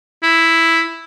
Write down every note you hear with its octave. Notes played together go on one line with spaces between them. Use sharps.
E4